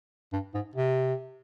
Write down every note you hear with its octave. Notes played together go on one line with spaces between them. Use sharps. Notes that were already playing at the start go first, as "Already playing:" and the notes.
G2
G#2
C3